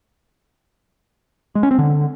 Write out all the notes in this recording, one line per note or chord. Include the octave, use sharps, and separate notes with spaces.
G#3
C#4
C4
D3